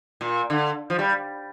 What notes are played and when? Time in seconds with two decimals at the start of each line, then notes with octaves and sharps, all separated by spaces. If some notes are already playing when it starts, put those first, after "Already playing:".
0.21 A#2
0.50 D3
0.90 F3
0.99 G3